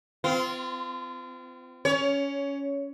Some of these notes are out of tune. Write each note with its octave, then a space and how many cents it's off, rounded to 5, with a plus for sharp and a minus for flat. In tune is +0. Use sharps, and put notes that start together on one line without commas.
C4 -35 F4 -15
C#4 +10 C#5 +20